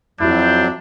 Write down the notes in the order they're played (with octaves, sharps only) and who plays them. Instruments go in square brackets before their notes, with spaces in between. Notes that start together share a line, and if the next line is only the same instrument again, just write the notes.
[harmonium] F2 F#3 [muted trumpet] D4 [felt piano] E4 F#4 [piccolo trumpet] G6